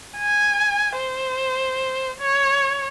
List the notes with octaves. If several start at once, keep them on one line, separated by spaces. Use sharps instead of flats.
G#5
C5
C#5